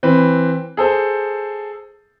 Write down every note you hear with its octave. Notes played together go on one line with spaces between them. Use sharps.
E3 C4 B4
G#4 A4 C5